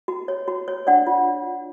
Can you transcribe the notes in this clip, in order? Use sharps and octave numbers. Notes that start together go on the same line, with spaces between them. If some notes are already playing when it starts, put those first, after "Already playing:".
F#4
C#5
F#4
C#5
D4 D5 F#5
F4